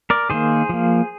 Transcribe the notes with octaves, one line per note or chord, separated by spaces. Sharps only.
A#4 D5
D#3 A#3 G#4 C5
F3 A#3